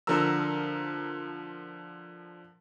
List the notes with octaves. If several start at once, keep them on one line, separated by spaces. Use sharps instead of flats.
D3 F3 A#4 A#5 E6